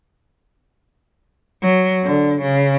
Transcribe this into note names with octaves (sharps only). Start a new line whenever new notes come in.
F#3
D3
C#3